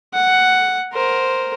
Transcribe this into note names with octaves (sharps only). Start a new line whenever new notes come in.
F#5
A#4 C5